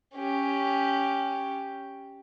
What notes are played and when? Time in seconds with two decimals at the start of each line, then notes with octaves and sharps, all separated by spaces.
0.15 C#4 G4